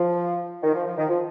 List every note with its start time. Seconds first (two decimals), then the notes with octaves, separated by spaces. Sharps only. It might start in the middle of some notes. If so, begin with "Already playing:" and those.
Already playing: F3
0.63 D#3
0.74 F3
0.86 F3
0.98 D#3
1.09 F3